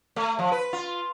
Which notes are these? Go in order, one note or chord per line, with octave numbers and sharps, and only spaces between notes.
A3
F3
B4
F4